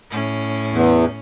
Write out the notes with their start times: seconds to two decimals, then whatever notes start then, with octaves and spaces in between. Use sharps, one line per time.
0.11 A2 C#4
0.72 E2